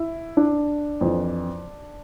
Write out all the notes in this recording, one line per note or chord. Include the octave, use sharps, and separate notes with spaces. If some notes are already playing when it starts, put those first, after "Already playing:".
Already playing: E4
D4
F2 E3